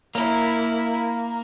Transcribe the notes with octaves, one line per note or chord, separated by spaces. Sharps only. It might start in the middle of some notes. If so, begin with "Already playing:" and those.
A#3 E4